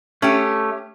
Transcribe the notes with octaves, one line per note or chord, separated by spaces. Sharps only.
A3 C#4 G4